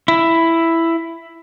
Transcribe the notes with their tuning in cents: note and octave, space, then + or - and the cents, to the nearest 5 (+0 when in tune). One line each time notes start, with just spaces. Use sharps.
E4 +5